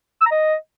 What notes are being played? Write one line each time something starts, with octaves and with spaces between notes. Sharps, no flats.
E6
A#5
D#5